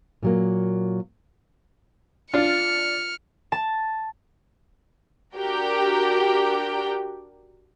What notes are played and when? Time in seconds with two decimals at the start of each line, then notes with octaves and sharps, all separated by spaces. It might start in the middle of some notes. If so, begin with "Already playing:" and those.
0.23 A#2 F#3 A#3
2.34 D4 F4 F6 C#7
3.52 A5
5.34 D4 F#4 G4 A#4 G5